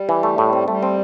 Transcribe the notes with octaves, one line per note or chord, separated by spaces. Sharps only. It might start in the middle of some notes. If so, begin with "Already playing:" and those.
Already playing: G3
E3
A3
A2
C4
G3 A3
C4